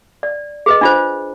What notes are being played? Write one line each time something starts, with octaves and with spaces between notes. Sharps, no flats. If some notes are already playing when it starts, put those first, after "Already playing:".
D5
G#4 B4 D#5
D4 F4 C5